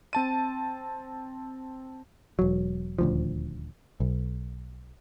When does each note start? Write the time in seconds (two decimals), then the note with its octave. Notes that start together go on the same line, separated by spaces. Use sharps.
0.13 C4 A5 D#7
2.39 E1 F#3
2.99 D#1 D2 F3
4.00 B1